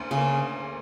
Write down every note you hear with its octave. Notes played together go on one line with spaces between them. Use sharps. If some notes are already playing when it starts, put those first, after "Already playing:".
Already playing: D2 D3 A#3 C#4
C#3
A#3